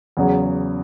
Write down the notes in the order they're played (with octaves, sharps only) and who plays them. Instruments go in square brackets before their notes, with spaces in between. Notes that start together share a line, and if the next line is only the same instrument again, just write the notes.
[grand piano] E2 C#3 F#3